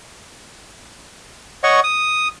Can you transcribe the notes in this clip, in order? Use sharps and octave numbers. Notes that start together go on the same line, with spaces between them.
C#5 D#5 F#5 C#6
D#6